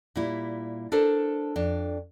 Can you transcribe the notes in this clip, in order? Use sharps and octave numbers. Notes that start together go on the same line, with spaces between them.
A#2 G3 E4
D4 A4 A#4 C5
F2 D4